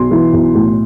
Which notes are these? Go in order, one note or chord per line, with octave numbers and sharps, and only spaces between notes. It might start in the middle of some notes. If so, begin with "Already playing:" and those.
Already playing: B1 C6
E3
B1
A2